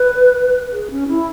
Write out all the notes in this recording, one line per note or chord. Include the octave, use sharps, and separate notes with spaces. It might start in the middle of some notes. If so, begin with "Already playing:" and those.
Already playing: B4
G#4
C#4
E4